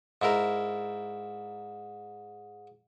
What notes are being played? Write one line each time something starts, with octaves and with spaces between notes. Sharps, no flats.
G#2 E4 A#4